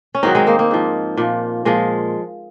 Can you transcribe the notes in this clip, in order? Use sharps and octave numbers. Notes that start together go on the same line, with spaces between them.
C#4
G#2 D#3 F#3 C4 D#4
G#3 C4
A#3
A#3
G#2 F3
A#2 F3
A#2 F3 G#3